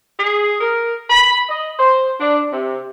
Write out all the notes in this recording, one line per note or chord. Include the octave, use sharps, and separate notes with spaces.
G#4
A#4
B5
D#5
C5
D4
C3